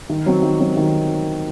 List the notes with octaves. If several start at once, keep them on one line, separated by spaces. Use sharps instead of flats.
D#3
F#3 C4
D#3
F#3 C4
D#3